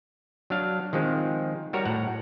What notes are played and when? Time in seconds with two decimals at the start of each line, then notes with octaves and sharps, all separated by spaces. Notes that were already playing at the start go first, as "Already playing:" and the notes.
0.50 F#3 D4 F5
0.93 D#3 F3 G#3 C4
1.73 G3 F#4 A#4 C#5
1.85 A2 F#5